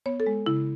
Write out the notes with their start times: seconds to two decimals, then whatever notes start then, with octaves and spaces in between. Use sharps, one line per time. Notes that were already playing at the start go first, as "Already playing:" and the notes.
0.06 B3 C#5
0.20 A4
0.26 G#3
0.46 C#3 E4